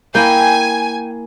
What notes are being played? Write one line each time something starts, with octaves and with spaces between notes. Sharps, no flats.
A#3 E4 G5 G#5